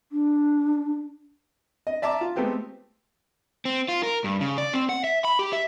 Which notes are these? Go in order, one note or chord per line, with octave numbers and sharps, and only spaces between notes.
D4
D#5
D5 E5 A5 A#5 D6
F4
G#3 A3 B3 C4 G4
C4
F4
A#4
G2
C#3
D5
C4
F#5
E5
B5
G4
E5